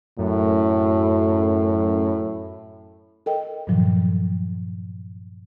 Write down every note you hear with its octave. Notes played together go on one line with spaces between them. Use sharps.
F#2 A2
A4 A#4 D#5 G5
G2 A#2 D#3 F3 F#3